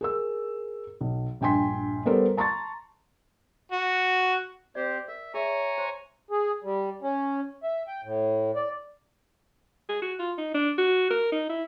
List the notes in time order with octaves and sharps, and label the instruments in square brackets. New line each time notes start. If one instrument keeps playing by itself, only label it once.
[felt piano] G#4 A#4 E6
B1
A#1 G2 G5 G#5 C6 B6
G3 B3 A4 A#4 C5 D5
A5 A#5 C6 C#6 A6
[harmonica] F#4
[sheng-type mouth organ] C4 G4 C5 [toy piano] D5
[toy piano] A#4 [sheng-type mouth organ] E5
[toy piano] G#4 E5 [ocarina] C#5 [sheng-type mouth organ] G#5 A#5 C#6
[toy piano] C5 C6
[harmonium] G#4
G3
C#4
E5
G5
A2
D5
[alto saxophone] G#4
F#4
F4
D#4
D4
F#4
A#4
D#4
E4